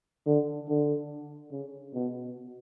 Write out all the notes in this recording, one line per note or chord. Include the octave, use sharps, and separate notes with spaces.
D3
D3
C#3
B2